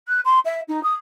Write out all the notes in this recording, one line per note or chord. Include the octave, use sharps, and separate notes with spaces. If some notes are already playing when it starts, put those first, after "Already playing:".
F#6
C6
E5
D#4
D#6